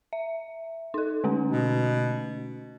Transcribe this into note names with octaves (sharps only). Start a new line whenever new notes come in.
E5
D#4 A4
D3 A3 C#4
B2